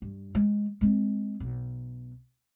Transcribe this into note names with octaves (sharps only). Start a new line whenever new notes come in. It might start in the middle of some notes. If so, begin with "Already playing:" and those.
G2
D#3 G#3
G#3 C4
B1